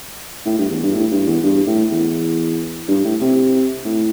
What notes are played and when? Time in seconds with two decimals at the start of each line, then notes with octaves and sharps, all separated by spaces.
0.46 A2
0.58 G2
0.70 E2
0.83 G2
0.94 A2
1.11 G2
1.26 E2
1.43 G2
1.67 A2
1.91 E2
2.88 G2
3.04 A2
3.21 C3
3.85 A2